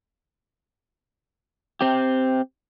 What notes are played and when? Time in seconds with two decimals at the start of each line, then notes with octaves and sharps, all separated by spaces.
1.81 C4 G4